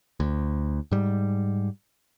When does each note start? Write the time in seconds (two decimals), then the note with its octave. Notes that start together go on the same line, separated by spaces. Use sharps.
0.20 D2
0.91 G#2 G3